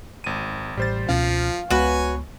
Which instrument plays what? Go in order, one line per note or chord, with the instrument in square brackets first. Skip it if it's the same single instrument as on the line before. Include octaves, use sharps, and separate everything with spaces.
[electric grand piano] G#1 D#7
[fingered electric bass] A1 [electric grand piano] G3 C5 A6
[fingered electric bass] C#2 B2 C#4 [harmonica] F3 [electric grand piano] F5
[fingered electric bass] C#2 G#3 B3 [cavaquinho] F#4 B4 [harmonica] C#5 G#5